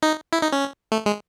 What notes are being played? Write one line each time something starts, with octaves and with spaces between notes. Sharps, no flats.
D#4
E4
D#4
C#4
A3
G#3